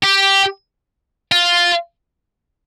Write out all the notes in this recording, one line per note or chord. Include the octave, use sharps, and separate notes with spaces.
G4
F4